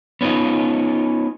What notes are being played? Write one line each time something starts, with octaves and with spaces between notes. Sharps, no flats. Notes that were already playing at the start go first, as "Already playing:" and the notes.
B3 C#4 D#4 F4